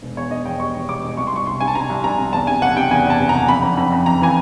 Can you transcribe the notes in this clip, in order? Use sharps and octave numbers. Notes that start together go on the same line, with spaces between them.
E1
E2 C#5
E2 D#5
E2 G5
G3 C#6
E2
E1 D6
E1
C2 C#6
C6
C2 C#6
C3 C6
C3 G#5
A5
C3 A#5
C2
C2 A#5
C3
E2 A5
C3 G#5
F#1 F#5
C3 G5
E2 G#5
E2 A5
C3
A#5
F#1
F2 B5
F2
F2
F2
F2 A#5
E3 G#5